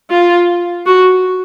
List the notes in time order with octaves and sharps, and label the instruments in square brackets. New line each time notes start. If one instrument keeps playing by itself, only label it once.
[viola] F4
F#4